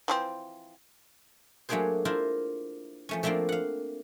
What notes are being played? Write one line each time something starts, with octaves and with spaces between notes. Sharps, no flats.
E3 F3 C4
F#3 A3 A#3 D4 G#4 C5
D4 E4 F4 A#4 C5
F3 A3 C#4
F3 A3 A#3 C4 D4 F4
F5 F#5